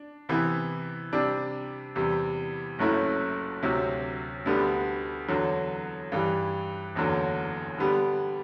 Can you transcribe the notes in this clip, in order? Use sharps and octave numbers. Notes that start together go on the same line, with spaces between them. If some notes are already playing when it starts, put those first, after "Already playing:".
Already playing: D4
C3 E3 B3 E4
C3 G3 D4
E2 C3 G3
F#1 F#2 F#3 A3 E4
D2 C3 F#3
D2 D3 G3 B3
E2 D3 F#3
G2 E3 G3
F#1 E2 D3 F#3
D3 G3 B3